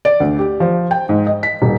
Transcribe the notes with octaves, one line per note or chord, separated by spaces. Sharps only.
D5
D2
G4
F3
G5
G#2
D#5
B6
D#1